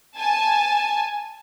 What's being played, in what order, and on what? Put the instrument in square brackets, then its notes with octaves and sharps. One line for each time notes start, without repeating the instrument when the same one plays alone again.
[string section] G#5 A5